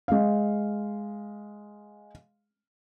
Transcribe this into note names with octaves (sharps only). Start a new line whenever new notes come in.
G#3 F5